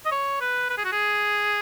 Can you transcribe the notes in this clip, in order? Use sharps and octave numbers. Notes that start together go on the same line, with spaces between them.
D#5
C#5
B4
B4
G#4
F#4
G#4